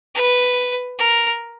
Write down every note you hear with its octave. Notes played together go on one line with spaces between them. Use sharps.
B4
A#4